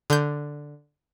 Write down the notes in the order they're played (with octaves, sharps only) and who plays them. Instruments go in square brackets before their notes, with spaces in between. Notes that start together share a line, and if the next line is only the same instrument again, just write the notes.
[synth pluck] D3 G6